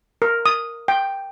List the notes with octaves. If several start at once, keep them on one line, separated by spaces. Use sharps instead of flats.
A#4
D#6
G5